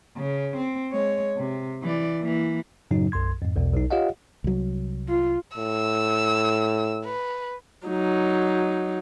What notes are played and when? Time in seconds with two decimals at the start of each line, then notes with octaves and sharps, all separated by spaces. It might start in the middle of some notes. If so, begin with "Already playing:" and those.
0.16 C#3
0.57 C4
0.91 G#3 C#5
1.37 C3
1.82 E3 D5
2.21 E3 A#3
2.91 F#2 A2 C#3 F#3 D#4
3.12 B1 F#2 C6 G#6
3.42 F2 G#2
3.55 B1 E2 B2
3.74 B1 D#4
3.91 F4 G4 C#5 D#5 F5 F#5
4.44 C2 F#3
5.08 F4
5.57 A2 E6
7.05 B4
7.87 F#3 D#4